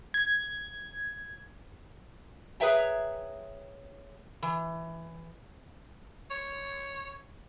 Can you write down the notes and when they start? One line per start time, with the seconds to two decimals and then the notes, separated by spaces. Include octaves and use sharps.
0.14 G#6
2.60 G#4 B4 C#5 E5 G5 A#5
4.42 E3
6.31 C#5